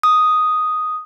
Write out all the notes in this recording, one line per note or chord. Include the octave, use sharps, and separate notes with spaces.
D#6